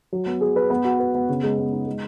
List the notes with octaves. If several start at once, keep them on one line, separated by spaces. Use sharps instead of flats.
F#3
B3
G#4
B4
B3
F#4
B4
B3
C#3
G#3
B3
D#4
G#3